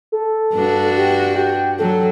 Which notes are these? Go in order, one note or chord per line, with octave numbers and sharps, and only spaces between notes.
A4
G2 D4 F#4
G4
G5
F#3 A4